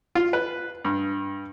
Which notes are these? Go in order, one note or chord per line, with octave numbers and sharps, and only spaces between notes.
F4
B4
G2